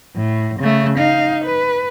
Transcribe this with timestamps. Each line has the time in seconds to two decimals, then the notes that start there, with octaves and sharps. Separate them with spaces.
0.16 A2
0.59 C#3 A3
0.98 D#4 F5
1.44 B4